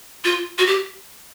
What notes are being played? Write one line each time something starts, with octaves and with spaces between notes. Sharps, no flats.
F4
F#4
G4